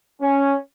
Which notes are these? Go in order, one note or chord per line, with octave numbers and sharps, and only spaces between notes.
C#4